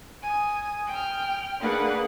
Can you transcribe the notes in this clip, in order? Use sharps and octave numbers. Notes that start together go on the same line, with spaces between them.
G#5 D#6
G5 F6
A#3 D4 G#4 B4 F#5